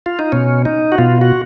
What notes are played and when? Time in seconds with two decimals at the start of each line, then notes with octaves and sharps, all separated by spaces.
0.06 F4
0.19 D#4
0.32 B2 C#4
0.65 D#4
0.92 F#4
0.98 B2 F4
1.21 F#4